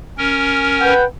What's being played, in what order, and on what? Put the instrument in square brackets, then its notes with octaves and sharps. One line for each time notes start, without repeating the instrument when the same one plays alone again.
[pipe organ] C#4 A#4
[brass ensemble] B4 F#5 G5